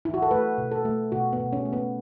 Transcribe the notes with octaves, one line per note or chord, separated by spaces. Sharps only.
E4
F#4
A4
A3 B4
B2
A4
A3
B2 F#4
B3
B2
C#4
A3
B3